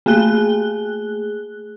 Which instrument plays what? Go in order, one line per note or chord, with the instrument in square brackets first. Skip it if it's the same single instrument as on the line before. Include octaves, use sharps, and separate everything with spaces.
[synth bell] A3 A#3 G#4 F#6 G7